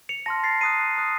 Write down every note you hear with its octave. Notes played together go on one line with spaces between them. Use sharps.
C#7 F7
A5 C6 F6 A#6
A6 C7
A#5 D#6 F#6 C7 D#7
A#5 D#6 F#6